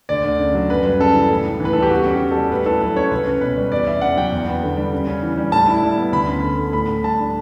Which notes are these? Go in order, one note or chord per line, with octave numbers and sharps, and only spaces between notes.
D2 D5
D2
C#3
F#3
F#2 B4
G3
C#3 A4
E3
A2
A2
E3
B4
G3 A4
G4
E2 F#4
C#4
G4
C#3
G3 A4
A2 B4
E4 A4
F#3 B4
C#4 C#5
C#2 B4
C#4
B2 B4
G3
E2 D5
C#4 E5
C#3 F#5
F#3 G5
E2
B3
D3
G3
C#3
C#4
E3
G3
A2 A5
E4
G3
B3
D2 B5
C#4
D3
A3
A2 B5
A2
G3 A5
D4